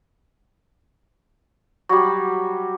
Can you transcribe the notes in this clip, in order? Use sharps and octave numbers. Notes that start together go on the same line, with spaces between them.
F#3 G3